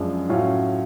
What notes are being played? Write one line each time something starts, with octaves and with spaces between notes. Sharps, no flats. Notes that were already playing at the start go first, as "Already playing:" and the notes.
Already playing: F#2 F3 G#3 D4
A2 F#3 C#4 F4